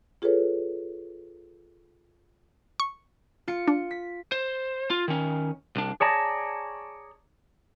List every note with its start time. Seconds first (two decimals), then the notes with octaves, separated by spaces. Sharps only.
0.22 F4 G#4 A4 B4 C#5
2.80 C#6
3.48 F4 C#7
3.68 D4
3.91 B6
4.32 C5
4.90 F4
5.08 D#3 C#4
5.76 C2 D4
6.00 G#4 C#5 D5 A5 A#5